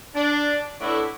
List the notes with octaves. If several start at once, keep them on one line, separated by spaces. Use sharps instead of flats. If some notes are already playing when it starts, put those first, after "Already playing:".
D4
A2 A3 B3 D4 E4